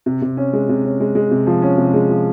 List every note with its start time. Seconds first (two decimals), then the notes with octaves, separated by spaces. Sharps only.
0.06 C3
0.22 C3
0.37 C#4
0.53 G#3
0.69 C3
0.85 C#4
1.00 G#3
1.15 G#3
1.31 C3
1.47 F3
1.62 C#4
1.78 C3
1.94 G#3
2.10 F3